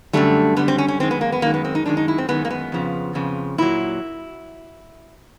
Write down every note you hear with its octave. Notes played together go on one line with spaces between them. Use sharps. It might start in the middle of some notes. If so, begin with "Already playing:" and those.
F#2 D3 G3 A3
F#2 D3 G3 B3
C4
C#4
C#4
F#2 D#3 G#3 C4
B3
A#3
B3
F#2 D#3 G#3 A#3
B3
C4
D#4
F#2 D#3 G#3 D4
D#4
E4
C4
F#2 D#3 G#3 B3
A#3
B3
F2 C#3 F3
F2 C#3 F3
A#2 F#3 E4